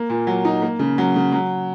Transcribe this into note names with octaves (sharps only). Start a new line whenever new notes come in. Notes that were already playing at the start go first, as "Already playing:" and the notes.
Already playing: A#3
A#2
F#3
D#4
A#3
C#3
F#3
C#3
F#3